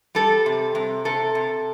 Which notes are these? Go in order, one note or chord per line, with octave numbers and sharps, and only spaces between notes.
G3 A4
C3
C3
C3 A4
C3